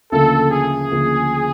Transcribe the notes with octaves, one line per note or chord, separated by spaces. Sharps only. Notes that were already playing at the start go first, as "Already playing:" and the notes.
D2 C#3 F3 A#3 A4
G#4
D2 C#3 F3 A#3